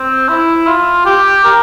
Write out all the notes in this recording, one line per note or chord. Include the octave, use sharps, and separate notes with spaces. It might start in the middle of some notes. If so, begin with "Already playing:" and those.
Already playing: C4
E4
F4
G4
A#4